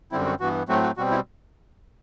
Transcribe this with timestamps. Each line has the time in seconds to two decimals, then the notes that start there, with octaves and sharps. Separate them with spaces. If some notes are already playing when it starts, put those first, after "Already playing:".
0.12 F#2 D3 G3 C4 E4
0.26 F#4
0.40 G2 E3 B3 F#4
0.69 A2 F#3 A3 C4 F#4
0.83 F#4
0.97 B2 G3 C4 F#4
1.11 E4